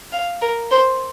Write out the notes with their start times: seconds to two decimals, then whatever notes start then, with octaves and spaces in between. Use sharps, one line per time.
0.12 F5
0.41 A#4
0.71 C5